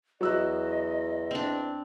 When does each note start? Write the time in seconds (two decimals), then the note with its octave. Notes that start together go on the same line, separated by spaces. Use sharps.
0.21 E2 F#3 D#5 E6 F#6
1.31 C4 D4